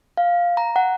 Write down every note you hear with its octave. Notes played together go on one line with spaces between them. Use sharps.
F5
A#5
F#5